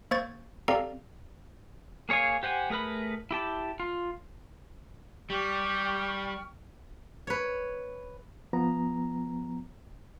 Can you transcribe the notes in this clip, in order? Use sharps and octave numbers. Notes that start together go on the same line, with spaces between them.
A#3 C5 C#6 G#6 A6
C4 G4 A4 D5 F5 A#5
A#3 G#4 C#5 F5 G#5
G4 C5 F#5 G#5
A3 G#4 A#4 B4 B5
E4 G4 A5
F4
G3 G4 G5 C#6 F6
B4 C#5
F3 B3 A#5